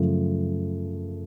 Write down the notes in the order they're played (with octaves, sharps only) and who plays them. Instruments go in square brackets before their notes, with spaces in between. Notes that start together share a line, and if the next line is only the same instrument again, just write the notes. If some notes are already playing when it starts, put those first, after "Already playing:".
Already playing: [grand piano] F#2 C#3 F3 A3